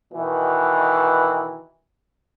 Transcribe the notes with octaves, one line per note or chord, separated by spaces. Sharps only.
B2 D#3 E3